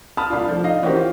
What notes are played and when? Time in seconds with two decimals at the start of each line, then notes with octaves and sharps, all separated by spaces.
0.17 A5 B5 D#6 F6
0.30 C2 D4 F4
0.48 F3 A3
0.64 D4 D#4 D#5 F5
0.83 E3 C#4 F#4 G4 A#4 C5
0.96 F4